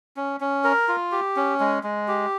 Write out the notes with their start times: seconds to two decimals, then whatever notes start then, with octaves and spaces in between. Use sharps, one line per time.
0.17 C#4
0.40 C#4
0.64 A#4
0.88 F4
1.12 G4
1.36 C#4
1.60 G#3
1.83 G#3
2.08 G4